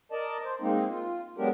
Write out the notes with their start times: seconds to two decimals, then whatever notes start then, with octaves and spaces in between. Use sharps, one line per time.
0.12 A#4 D5 D#5 A5
0.44 C5
0.61 G#3 A#3 C4 D#4
0.89 F4
1.37 F#3 G#3 B3 D4 G4 A#4